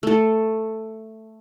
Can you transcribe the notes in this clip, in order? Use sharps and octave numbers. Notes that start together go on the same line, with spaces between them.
A3 A4